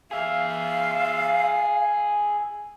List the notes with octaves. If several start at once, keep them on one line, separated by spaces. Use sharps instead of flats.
G#4 E5 F5